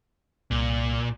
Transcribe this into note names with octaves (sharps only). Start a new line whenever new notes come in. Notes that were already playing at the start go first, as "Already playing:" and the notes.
C2 A#2